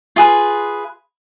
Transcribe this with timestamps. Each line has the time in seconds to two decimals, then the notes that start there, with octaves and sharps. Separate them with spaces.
0.16 F4 G#4 B4